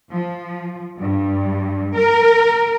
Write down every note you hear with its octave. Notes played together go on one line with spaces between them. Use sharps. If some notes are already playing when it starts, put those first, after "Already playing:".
F3
G2
A#4